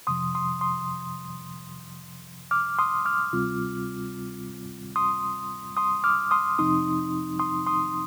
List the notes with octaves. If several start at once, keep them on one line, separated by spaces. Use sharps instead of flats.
F2 C3 F3 C6 D#6
C6 D#6
C6 D#6
D6 F6
C6 D#6
D6 F6
D2 C3 G3 C4 F4
C6 D#6
C6 D#6
D6 F6
C6 D#6
F2 C3 F3 C4 D#4 C6 D#6
C6 D#6
C6 D#6